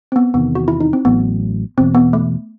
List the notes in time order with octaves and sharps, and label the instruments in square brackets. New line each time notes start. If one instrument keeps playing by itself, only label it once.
[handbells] C4
B3
[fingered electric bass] E2 C3 D#3 [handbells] B3
[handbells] F#4
E4
D#4
C4
[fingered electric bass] A1 A2 F#3 [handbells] B3
[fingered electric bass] E1 E2 B2 [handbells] C4
[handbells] B3
A3